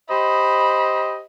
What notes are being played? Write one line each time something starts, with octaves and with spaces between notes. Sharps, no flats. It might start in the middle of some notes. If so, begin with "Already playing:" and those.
G4 C5 D#5 B5